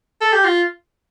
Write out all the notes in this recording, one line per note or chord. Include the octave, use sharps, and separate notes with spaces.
A4
G4
F4